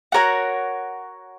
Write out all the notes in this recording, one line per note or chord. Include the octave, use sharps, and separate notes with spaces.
F#4 A#4 C#5 F#5